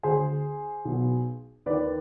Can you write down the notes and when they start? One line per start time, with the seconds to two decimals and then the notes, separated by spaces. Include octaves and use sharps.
0.03 D2 D3 G#4 C5
0.85 B1 B2
1.66 D#2 D#3 B4 D5